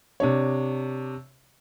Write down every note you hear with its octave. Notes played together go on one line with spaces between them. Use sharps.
C3 D4 C#5